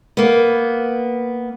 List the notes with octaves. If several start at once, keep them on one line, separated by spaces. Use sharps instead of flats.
A#3 B3